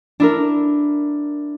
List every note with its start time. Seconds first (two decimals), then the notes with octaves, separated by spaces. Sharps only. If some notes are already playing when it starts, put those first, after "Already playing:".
0.20 D4 E4 A#4